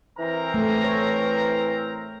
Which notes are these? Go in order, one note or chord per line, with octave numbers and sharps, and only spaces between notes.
E3 C4 A#4 A#5
A3
C#5